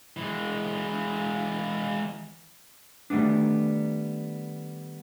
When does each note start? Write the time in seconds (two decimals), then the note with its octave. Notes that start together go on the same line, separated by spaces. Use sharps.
0.17 E3 G#3
3.10 D#3 G3 A3 B3 D4